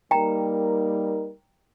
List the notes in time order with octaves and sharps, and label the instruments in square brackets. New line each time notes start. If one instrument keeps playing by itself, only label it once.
[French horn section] G3 A#3 D#4 A#4 [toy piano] G5 A#5